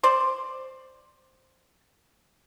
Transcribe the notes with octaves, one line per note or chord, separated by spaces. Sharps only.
C5 D5